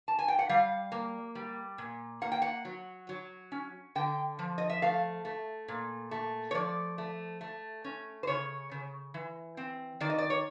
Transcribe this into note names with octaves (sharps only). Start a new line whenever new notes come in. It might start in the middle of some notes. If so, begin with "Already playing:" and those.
A5
G#5
G5
F#5
G3 F5
A#3
G3
A#2
A#3 F#5
G5
F#5
F#3
F#3
C#4
D3 G5
F3
D#5
E5
A3 F5
A3
A#2
A3
C#5
F3 D5
A3
A3
C#4
C5
C#3 C#5
C#3
E3
C4
D#3 D5
D#5
D5
C#5